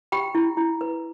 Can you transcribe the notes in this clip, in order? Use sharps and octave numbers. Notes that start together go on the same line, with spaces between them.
G4 G5 B5
E4
E4
B4